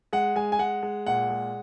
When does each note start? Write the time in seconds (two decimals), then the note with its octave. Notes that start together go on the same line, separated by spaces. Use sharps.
0.13 G#3 F#5
0.36 G#3 G#5
0.52 G#5
0.59 G#3 F#5
0.83 G#3
1.06 A#2 F#5
1.30 G#3